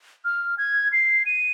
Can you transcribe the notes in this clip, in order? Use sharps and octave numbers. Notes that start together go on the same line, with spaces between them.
F6
G#6
C7
D#7